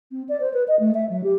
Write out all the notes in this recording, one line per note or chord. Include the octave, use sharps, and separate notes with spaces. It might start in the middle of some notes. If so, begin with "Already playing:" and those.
C4
D5
C5
B4
D#5
A3
E5
F#3
G4